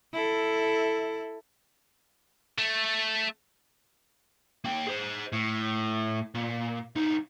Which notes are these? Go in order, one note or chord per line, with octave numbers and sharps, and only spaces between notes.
E4 A4
A3
A#3 G5
G#4 C5
A2
A#2
C2 D#4